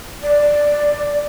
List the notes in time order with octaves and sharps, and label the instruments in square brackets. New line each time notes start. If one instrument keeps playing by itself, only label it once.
[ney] D5